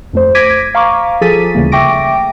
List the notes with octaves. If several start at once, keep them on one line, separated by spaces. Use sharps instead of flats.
F2 A3 C5
D6 G#6 A#6 B6 D7 D#7
F5 A#5 C#6 D6
F3 G#4 A4 A6 B6 D#7
D2 C#3 E3 G3 A3 A#3
E5 G5 C#6 D6 A#6 D7